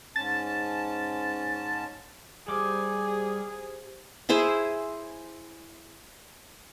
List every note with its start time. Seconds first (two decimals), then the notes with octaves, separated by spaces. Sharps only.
0.16 G#2 C#4 A5 A6
2.48 G3 G4 G#4 C5 D6
4.29 E4 G#4 C5 E5